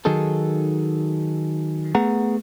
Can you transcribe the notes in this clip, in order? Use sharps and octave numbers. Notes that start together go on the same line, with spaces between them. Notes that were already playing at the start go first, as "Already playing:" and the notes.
D#3 F#3 D#4 G#4 A4
A3 B3 G#4 F#5 A#5